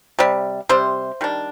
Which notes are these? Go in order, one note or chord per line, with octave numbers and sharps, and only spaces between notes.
C3 G3
C3 G3 C5
D#3 G3 D4